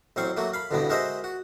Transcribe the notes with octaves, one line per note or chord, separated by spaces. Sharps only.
A1 F#3 C4 F5 C#6
F#3 A3 A#3 F#4
F5 B5
A1 D2 G2 B2 D3 B3
G#3 F#4 A#4 C5 D#5 E5
F#4